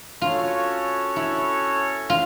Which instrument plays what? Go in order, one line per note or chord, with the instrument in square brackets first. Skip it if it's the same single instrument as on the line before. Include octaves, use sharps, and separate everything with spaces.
[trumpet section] C#4 F#4 A4 C#5 [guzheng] F4
[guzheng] E4
F4